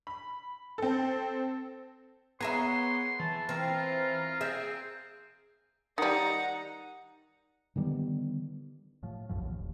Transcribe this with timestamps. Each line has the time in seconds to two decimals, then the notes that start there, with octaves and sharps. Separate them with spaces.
0.07 B5
0.78 C4 A4
2.41 B3 G#4 A#4 C#5 E5 C6
3.20 E3 A5
3.49 C4 F4 A#4
4.41 C4 G#4 E5
5.98 D#3 G3 D#4 F#5 A#5
7.76 D3 D#3 G3 B3
9.03 A2 F3
9.29 A#1 F#2 A2 F3
9.42 A#1 D#2
9.59 D#1